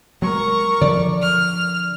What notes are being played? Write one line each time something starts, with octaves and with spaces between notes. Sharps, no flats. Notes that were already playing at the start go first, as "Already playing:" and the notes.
F#3 G#3 A#4 C#6
D3 F3 D5
F6